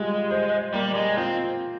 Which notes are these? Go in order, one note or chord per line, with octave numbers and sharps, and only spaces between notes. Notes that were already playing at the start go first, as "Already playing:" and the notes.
Already playing: G3 G#3 F4
C5
G3 A#3
G#3
C4 F4